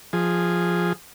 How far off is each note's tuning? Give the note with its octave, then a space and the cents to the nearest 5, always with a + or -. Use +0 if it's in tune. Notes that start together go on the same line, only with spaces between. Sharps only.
F3 +0 G#4 -10